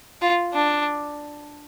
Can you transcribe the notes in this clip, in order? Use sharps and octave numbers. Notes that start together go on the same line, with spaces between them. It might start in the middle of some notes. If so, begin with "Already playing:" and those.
F4
D4